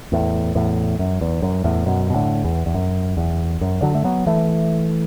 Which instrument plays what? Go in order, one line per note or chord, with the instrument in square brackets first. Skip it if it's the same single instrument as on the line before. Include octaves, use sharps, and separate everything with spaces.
[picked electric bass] E2 A2
E2 A2
F#2
E2
F#2
E2 A2
F#2 B2
B2
A2 D3
E2
E2
F#2
E2
F#2
D3 F#3
A3
F#3 B3
E3 A3